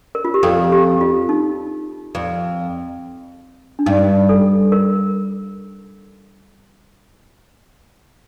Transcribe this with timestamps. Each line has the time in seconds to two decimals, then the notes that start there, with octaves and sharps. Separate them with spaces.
0.15 A#4
0.25 F4
0.34 G4
0.43 F2 A4
0.72 G4
1.01 F4
1.29 D#4
2.15 F2
3.79 D4
3.86 G2 D#4
4.29 A4
4.72 A#4